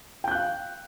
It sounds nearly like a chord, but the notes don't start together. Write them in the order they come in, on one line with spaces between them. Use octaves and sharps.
G5 G6 F#6 F5